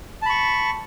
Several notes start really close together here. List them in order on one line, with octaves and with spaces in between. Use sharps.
A5 B5 C#6